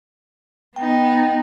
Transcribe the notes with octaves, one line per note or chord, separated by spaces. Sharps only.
B3 D#4 G5